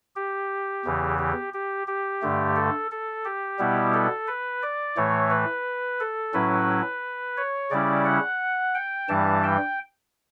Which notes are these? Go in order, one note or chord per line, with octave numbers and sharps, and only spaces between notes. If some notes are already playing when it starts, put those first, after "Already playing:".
G4
E2 C#3 E3
G4
G4
G4
G2 D3 A3
A4
A4
G4
B2 G3 B3 E4
A4
B4
D5
A2 E3 A3 C#5
B4
A4
A2 F#3 C#4 E4 B4
C#5
C#3 G3 C#4 E4 D5
F#5
G5
G2 E3 G3 A5
G5